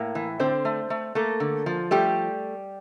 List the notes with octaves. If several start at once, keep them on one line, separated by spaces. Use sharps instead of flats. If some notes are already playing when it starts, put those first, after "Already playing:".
Already playing: A2 A#3
E3
D3 C4 C5
A3
A3
A3 A#3 A4
D3
F3
G3 A3 G4